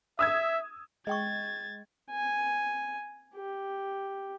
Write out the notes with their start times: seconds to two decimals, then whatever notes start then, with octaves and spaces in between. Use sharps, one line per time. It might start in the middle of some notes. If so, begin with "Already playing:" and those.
0.19 E5 D#6 E6 G#6
1.07 G#3 D#5 G5 C#6 G#6 A6
2.11 G#5
3.35 G4